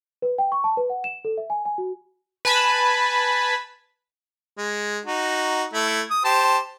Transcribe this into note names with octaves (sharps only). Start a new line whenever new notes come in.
B4
G5
C#6
A5
B4
F#5
E7
A4
E5
G#5
G#5
F#4
B4 G#5 A5 B5
G#3
D#4 F#4
A3 E4
D#6
G4 C5 A5